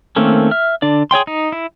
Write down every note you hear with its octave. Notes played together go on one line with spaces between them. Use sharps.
D#3 A3 A#3 C4 C#4
E5 F6
D3 D4 D5
G#4 C#5 G5 C6
D#4
E4